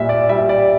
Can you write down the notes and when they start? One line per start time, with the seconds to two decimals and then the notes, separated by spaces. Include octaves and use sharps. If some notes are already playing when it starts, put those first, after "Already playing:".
Already playing: A#2 G3 E5
0.09 D5
0.29 G3 E5
0.49 D5